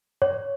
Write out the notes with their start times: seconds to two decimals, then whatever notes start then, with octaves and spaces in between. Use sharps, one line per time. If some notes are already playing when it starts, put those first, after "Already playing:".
0.22 C#5